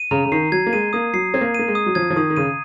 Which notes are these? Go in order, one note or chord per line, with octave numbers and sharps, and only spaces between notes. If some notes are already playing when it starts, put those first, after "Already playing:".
Already playing: D#7
C#3 A#5
C#3
D#3 C7
F#3 G#6
A#3
G#3 D#7
A#3 D#6
F#3 C7
C4 G#6
A#3
A#3 D#7
G#3
D#6
F#3
F3 G#6
F3
D#3 D#6
D#3
C#3 D#7